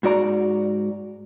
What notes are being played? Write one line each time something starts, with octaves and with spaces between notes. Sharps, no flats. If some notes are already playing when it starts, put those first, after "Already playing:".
G#2 F#4 D5 A#5